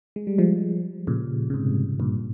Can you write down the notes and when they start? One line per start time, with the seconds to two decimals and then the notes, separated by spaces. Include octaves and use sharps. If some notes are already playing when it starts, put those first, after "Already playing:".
0.16 G#3
0.27 G3
0.38 F3 G#3
1.07 A#2 C#3
1.50 C#3
1.54 G#2 C3
2.00 G2 A#2